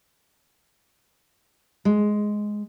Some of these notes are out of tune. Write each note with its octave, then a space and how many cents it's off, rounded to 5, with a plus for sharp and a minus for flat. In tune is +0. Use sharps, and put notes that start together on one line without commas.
G#3 +5